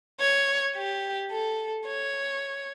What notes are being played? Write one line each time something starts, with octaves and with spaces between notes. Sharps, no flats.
C#5
G4
A4
C#5